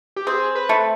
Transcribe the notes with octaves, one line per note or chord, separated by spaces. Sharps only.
G4
C4 G#4
B4
A3